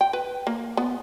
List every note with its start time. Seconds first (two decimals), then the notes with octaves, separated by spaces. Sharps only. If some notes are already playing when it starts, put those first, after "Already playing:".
0.01 G5
0.13 B4
0.47 A#3
0.77 B3